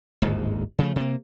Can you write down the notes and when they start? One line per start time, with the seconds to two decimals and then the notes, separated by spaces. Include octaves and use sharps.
0.22 D1 G1 D#2 G#2
0.79 C#3 F3 A3
0.96 C3 A#3